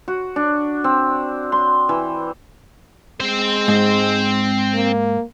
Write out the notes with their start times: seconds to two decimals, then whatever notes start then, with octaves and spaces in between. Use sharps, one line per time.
0.08 F#4
0.36 D4
0.84 C4
1.52 C6
1.89 E3
3.20 G#3 C4 C5
3.68 G#2
4.74 A#3